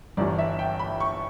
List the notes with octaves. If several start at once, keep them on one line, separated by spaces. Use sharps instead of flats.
G1 G2 E3 D5
E5
G5
B5
C#6